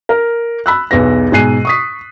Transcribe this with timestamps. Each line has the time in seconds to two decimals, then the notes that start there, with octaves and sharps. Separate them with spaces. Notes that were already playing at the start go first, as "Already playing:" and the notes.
0.09 A#4
0.66 B5 E6 F#6
0.91 B1 E2 B4 A#6
1.32 G#2 B2 G#5 F#6 C7 D#7
1.65 C#6 D#6 B6